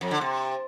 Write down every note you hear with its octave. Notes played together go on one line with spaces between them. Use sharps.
F2
D3
C3